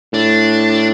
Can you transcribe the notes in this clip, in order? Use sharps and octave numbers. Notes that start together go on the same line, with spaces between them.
A2 D4